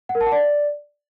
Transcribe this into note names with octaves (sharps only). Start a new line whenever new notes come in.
F#5
A#4
A5
F#5
D5